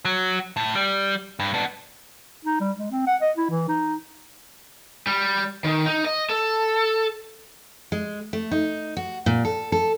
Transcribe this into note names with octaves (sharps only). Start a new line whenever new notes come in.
F#3
A2
G3
G2
B3 D4
D#4
G3
G#3
C4
F#5
D#5
E4
E3
D#4
G3
D#3
D#4
D#5
A4
G#3
A3
D#4
F#4
A#2
A4
A4